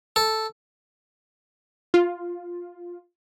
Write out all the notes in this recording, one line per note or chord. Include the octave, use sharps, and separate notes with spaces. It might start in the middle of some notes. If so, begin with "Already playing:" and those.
A4
F4